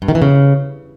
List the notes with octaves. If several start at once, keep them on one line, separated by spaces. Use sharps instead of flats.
G2
D#3
E3
C#3